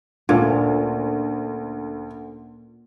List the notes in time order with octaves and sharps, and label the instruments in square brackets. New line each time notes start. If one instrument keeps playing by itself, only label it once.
[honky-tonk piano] D2 [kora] A#2 C#4